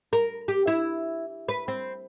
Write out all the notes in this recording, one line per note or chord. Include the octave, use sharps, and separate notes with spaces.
A#4
G4
E4
B4
C4